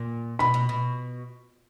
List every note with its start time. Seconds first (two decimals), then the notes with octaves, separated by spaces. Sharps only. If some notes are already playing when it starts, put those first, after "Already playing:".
Already playing: A#2
0.39 B2 B5
0.54 B2
0.69 B2